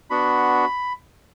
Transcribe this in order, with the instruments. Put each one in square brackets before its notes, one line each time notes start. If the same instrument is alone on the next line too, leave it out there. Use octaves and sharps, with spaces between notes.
[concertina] B3 D4 F#4 B5